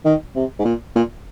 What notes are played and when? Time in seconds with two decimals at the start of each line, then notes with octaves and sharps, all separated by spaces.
0.05 D#3
0.35 C3
0.59 G#2
0.65 A#2
0.95 A#2